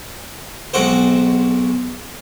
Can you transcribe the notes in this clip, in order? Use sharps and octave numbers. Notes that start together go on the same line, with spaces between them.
B1 G#3 C4 F#4 C5